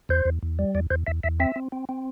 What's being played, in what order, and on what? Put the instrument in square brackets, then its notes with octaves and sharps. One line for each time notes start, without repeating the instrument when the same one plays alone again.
[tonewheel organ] E2 C5
E2
E2
G3
E2 D5
E2 C5
E2 E5
E2 E5
C4 E5
C4
C4
C4